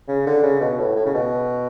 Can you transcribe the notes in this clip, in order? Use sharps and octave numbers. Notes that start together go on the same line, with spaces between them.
C#3
D3
C#3
B2
A2
A2
C#3
B2